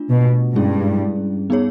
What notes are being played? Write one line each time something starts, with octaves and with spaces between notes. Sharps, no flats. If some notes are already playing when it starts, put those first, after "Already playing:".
Already playing: A3 D4 F4
B2
G2 G#3 C#4 E4 G#4
B3 D#4 G#4 C#5